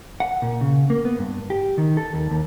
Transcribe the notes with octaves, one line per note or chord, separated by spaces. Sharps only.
F#5
A#2
C#3
A#3
B3
G2
G4
D#3
A4
D#2
D#2